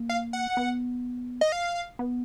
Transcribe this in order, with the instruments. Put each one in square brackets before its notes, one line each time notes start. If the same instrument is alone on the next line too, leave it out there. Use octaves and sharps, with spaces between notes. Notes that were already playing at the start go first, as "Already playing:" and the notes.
Already playing: [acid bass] A#3
[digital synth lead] F5
F#5
[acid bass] B3
[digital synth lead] D#5
F5
[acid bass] B3